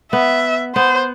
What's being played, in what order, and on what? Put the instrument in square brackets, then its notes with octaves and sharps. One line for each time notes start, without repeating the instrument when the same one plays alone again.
[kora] B3 [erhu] E5
[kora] B3 [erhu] C5